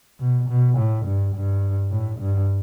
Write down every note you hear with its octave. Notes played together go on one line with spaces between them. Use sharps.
B2
B2
A2
G2
G2
A2
G2